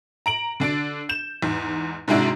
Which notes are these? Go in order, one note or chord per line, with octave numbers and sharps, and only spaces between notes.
A#5 D7 F#7
D3 D4 A6 D7
G6 E7
E2 G#2
G#2 C3 G#3 D4 E4 F#4